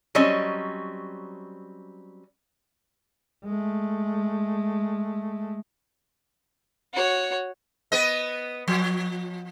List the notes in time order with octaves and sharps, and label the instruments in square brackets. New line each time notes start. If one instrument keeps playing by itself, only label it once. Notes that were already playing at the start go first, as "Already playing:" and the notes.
[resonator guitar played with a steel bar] F#3 G3 C4 C#4 D#5
[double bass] G#3 A3
[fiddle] F#4 C#5
[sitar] B3 B4 D#5
F3